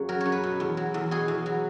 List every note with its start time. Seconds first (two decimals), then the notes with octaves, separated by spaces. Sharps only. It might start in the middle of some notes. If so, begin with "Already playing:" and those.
Already playing: F#2 C#3
0.09 F#3 A#4
0.21 C#5
0.26 F#2
0.32 B4
0.43 B2
0.60 E2
0.77 F#3
0.94 E2
1.11 B2 G#4
1.28 E2
1.46 F#3